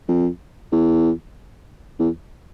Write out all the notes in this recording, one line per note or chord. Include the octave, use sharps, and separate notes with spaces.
F2
E2
E2